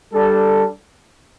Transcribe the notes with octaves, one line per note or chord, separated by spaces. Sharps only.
G3 D4 A4